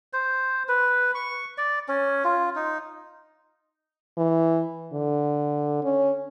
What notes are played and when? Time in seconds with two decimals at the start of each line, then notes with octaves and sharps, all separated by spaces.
0.13 C5
0.69 B4
1.15 C#6
1.58 D5
1.88 C#4
2.24 F4
2.56 D#4
4.17 E3
4.93 D3
5.83 C#4